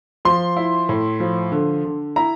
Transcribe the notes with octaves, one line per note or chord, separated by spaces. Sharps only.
F3 C6
E4
A2
F3
D3
D3
E4 A#5